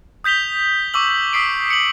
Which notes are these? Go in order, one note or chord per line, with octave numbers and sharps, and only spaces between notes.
D#6 G6 B6 F7 G7
C#6 D6 E6 F#7
D#6 B6 C7 D7
C#7 F#7